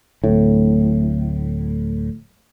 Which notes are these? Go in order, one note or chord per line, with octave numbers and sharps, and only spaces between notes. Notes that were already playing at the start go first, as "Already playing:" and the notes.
D1 A2